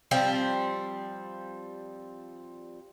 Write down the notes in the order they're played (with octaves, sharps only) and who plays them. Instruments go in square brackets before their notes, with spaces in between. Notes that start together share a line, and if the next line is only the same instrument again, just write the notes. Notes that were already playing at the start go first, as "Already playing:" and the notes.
[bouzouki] F3 G3 C4